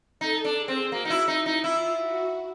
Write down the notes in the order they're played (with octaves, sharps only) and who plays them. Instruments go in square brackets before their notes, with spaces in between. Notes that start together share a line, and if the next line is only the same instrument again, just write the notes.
[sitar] D#4 [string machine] A4
[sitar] D4
[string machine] G#4
[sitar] C4
[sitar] A#3 [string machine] F#4
[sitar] D#4
E4
[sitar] D#4 [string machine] E4
[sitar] D#4
[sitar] E4 [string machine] F4
[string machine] F#4